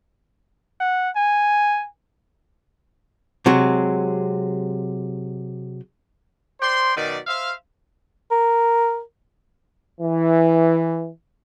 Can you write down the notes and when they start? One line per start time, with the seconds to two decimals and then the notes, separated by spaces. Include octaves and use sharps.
0.80 F#5
1.16 G#5
3.46 C3 F#3 G#3
6.61 C5 D5 G5 C6
6.97 F#2 B2 D#3 D5
7.27 C5 E5 F5
8.31 A#4
10.00 E3